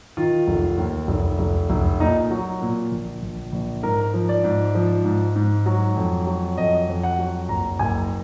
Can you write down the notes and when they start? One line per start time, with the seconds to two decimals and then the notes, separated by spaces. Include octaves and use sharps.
0.17 D#3 F4
0.48 F1
0.78 D#2
1.08 F1
1.39 F1
1.70 F1
2.00 A#2 D#4
2.30 F#3
2.61 A#2
2.92 A#1
3.22 A#1
3.52 A#1
3.83 G#2 A#4
4.14 F3
4.29 D5
4.44 G#2
4.75 F3
5.05 G#2
5.35 G#2
5.66 F#3
5.97 F2
6.27 F#3
6.58 F2 D#5
6.88 F2
7.03 F#5
7.19 F#3
7.49 F#1 A#5
7.79 F#1 G#5